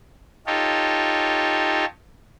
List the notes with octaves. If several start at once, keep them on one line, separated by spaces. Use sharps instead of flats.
D#4 F4 G4 A4 C#5